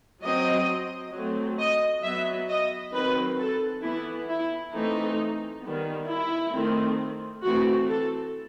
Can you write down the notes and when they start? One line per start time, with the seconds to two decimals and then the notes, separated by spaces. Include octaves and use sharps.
0.24 F#3 C4 D#5
1.14 F#3 A3 C4
1.60 D#5
2.04 F#3 B3 E5
2.49 D#5
2.94 D#3 F#3 C4 B4
3.39 A4
3.83 E3 B3 E4
4.28 E4
4.74 E3 A3 C4 D#4
5.63 D#3 G3 B3
6.08 E4
6.54 D#3 A3 C4
7.43 E3 A3 C4 F#4
7.89 A4